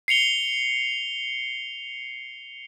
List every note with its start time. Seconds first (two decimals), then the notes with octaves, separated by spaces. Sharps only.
0.08 C7 C#7 F7 G7